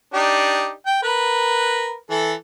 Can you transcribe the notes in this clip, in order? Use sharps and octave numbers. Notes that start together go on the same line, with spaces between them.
D4 D#4 G4
G5
A#4 B4
E3 A4